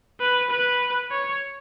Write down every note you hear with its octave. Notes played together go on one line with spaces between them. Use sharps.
B4
B4
C#5